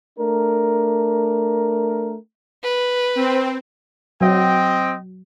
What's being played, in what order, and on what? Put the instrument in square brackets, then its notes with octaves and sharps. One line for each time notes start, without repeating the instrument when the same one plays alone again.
[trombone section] A3 D4 A#4
[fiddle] B4
[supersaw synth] C4
[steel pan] F#3 [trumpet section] C4 D#5 G5